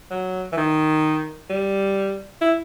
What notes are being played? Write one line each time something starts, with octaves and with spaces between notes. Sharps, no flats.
F#3
E3
D#3
G3
E4